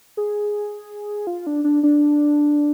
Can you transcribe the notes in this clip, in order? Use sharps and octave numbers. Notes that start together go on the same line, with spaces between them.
G#4
F4
D4
D4
D4